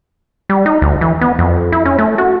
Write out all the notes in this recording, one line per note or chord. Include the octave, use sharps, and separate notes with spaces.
G3
D#4
D2
E3
B3
F2
E4
C#4
A3
F#4